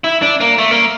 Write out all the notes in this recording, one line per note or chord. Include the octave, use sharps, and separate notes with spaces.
E4
D4
A#3
A3
A#3